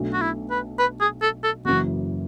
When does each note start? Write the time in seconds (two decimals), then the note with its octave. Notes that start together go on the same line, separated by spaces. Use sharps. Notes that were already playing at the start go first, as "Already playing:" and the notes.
Already playing: B1 B2 A3 D4
0.13 F#4
0.21 E4
0.50 B4
0.79 B4
1.00 G#4
1.22 A4
1.43 A4
1.65 F#1 F#2 C#3 E3 F#4